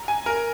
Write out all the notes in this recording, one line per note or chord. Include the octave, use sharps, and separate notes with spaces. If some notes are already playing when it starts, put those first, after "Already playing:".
Already playing: A#5
G#5
A#4